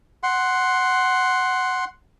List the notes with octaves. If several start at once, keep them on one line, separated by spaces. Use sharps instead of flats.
F#5 C6